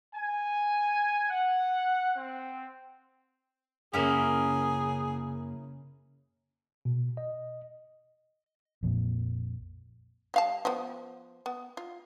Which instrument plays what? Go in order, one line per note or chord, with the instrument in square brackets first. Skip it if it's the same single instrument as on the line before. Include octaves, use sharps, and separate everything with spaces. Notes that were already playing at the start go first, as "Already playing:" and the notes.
[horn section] G#5
F#5
C4
[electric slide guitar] F#2 A#3 [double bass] C#3 [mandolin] C#4 E4 A#4 [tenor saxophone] G#4
[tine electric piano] B2
D#5
[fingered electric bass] A#1 F2 A#2
[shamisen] G3 F5 A5
F3 B3
B3
F4